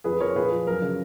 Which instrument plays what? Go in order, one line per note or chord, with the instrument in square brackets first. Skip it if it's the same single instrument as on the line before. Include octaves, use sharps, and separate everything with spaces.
[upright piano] F2 G#4 B4
F3 A#4 C#5
A#2 G#4 B4
F3
F#2 A#4
C#3